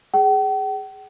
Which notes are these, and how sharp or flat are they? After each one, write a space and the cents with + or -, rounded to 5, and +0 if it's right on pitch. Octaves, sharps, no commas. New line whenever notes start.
G#4 +0 G5 -45